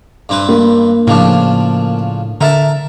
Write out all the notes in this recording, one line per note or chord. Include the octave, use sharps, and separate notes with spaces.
G2 C4 B4
A#3
A2 C#3 F3 D4
D3 A#4 E5 A5